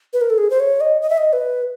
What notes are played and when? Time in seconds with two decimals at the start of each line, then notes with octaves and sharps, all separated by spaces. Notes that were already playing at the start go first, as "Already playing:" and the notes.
0.13 B4
0.21 A#4
0.30 A4
0.38 G#4
0.50 C5
0.60 C#5
0.81 D#5
1.01 D#5
1.10 E5
1.18 D#5
1.33 B4